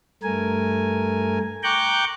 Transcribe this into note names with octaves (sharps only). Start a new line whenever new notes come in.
G2 A3 A#4 G#5
G5 A#5 C#6 D6 F#6 G6